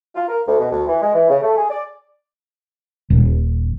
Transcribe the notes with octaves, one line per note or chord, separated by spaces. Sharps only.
F4
A#4
D2
B2
D2
E3
G#3
E3
C#3
A3
G#4
D5
D#1